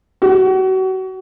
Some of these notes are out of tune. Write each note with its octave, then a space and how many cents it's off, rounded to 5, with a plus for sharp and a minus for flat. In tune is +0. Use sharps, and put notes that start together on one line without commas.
F#4 +30